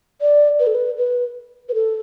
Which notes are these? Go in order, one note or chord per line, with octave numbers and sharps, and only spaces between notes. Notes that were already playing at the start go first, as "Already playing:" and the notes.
D5
B4
A4
B4
B4
B4
A4